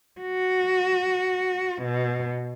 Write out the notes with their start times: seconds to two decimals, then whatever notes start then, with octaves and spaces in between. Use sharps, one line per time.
0.21 F#4
1.82 B2